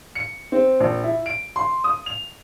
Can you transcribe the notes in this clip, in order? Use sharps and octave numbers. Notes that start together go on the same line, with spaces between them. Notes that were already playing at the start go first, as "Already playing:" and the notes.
C#7
C4
A#1
E4
D7
C6
D#6
F7